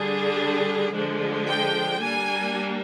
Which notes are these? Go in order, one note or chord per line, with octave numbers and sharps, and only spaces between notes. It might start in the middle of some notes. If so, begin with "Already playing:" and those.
Already playing: D3 G3 D4 G#4
D3 F3 G#3 D4
G5
G3 A#3 D4 G#5